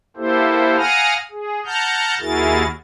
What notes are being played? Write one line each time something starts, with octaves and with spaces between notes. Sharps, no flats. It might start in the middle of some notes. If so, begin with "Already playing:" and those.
A#3 E4 G4 A4 C5
F5 F#5 G#5 A#5 D#6 F6
G#4
F#5 A5 A#5 F6 G6
D#2 E4 F#4 G#4 A#4 A6